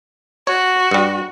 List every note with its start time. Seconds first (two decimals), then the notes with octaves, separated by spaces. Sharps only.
0.47 F#4 C#5
0.91 G2 G3